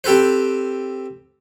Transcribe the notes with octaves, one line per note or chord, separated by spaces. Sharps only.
C4 G4 A4 B4 C5